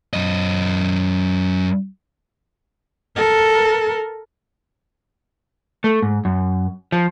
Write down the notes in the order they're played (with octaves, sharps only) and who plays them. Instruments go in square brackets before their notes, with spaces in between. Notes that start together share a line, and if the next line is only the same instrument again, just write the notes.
[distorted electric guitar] F#2 D#5
[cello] A4 A#4
[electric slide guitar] A3
G#2
F#2
F3